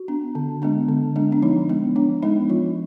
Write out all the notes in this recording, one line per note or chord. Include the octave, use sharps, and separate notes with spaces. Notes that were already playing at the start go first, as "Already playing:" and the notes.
Already playing: F#4
B3 D4
D3
G#3 B3 D4
D3
G#3 B3 D4
D4
F3 D#4
G#3 B3
F3 D4
G#3 B3 D#4
F3 F4